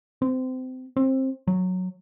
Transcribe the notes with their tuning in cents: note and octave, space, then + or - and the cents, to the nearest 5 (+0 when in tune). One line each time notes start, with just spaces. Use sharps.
C4 -25
C4 +20
F#3 -10